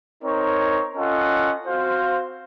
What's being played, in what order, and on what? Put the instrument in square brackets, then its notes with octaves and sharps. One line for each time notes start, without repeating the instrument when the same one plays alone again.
[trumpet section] C4 D#4 A#4 C#5
C#4 F4 A4 D#5 F#5
C4 F#4 C5 F5